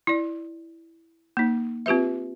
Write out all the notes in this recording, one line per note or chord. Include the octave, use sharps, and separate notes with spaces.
E4 D5
A#3 D#4
C4 F4 G4 B4 E5